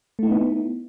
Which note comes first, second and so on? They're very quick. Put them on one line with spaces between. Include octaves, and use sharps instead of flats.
A3 E4 D#4 B3